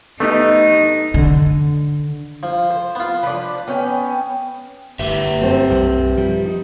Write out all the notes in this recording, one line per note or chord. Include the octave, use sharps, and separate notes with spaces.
A3 B3 D#4 G4
D3
F3
C5
B3 F4
F3 D4 B4
B3 C#4 G5
G1 G4 B4 E5
C4 A4 C5
B1 G2 G3
F3 G3
D#4